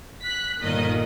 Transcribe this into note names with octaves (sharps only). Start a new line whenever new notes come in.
F#6 B6
G1 A#2 D#3 D#5